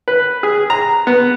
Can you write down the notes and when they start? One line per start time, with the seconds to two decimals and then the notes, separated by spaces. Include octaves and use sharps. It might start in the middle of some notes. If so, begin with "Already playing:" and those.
0.08 B4
0.43 G#4
0.70 A#5
1.07 B3